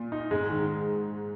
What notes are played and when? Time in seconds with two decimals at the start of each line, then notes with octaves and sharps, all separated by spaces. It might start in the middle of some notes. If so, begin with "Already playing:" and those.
Already playing: A#2
0.12 D#4
0.31 G#2 G#3
0.50 D#3